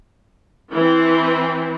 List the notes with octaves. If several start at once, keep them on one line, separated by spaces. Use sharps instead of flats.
E3 C4